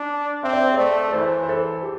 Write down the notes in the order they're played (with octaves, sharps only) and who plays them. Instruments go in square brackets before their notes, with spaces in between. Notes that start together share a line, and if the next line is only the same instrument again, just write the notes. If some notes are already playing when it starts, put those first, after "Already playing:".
Already playing: [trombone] D4
[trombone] C4 [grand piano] E5
[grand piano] D5
C5
[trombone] A3 [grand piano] D5
[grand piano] A4
[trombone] E3 [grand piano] C5
[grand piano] C5
A4
G4